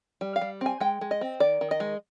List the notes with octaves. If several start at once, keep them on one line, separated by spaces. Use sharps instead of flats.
G3
F5
G3
C4 G#5
G#3 G5
G#3
D#5
C4
D#3 D5
D#3
D#5
G#3